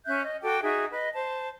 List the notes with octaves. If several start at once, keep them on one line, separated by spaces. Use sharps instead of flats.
C#4 E5 F#6 G6
D#5
F#4 A4 G5 D6
D#4 F#4 G#4 E5
B4 D#5
C5 A5